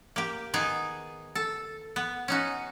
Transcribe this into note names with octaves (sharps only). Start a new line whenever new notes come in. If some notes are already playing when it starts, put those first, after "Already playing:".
A#3 G4
D#3 B3 D#4 G#4
A4
B3
C#4 D#4 F#4